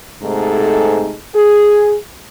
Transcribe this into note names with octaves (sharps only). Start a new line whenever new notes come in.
G#2 C3 A3 D#4 G#4 A4
G#4